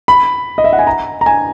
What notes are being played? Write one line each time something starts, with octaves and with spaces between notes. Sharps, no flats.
B5
D#5
E5
F#5
G#5
A#5
A#5
G#5